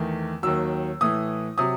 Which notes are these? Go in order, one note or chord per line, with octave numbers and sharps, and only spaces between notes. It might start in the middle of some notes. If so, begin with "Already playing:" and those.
Already playing: E2 D#3 A3
D#2 D#3 F#3 E6
A2 E3 A3 D#6
C3 F#3 D#6